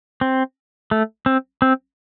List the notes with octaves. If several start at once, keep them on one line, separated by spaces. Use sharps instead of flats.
C4
A3
C4
C4